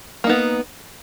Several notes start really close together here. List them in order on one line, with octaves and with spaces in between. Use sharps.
A#3 D#4 B3